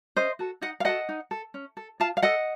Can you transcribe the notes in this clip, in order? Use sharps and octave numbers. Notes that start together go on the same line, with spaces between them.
C#4 C5 D#5
F#4 A4
D#4 D#5 F#5
F5
F#4 A4 D#5 F#5
D#4
A4
C#4
A4
F4 F5 A5
F5
A4 D#5 F#5